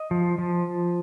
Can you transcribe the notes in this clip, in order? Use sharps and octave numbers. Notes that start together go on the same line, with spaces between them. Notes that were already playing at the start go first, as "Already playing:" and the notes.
Already playing: D#5
F3
F3